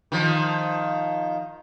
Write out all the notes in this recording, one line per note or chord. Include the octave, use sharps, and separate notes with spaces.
D#3 F3